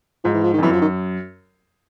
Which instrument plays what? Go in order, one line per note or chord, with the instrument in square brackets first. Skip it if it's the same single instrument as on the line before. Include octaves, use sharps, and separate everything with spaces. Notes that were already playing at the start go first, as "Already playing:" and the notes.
[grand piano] G#2 [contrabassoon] F3
[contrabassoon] E3
F3
D#3
[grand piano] F2
[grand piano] F#2 [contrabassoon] E3
[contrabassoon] F3
D#3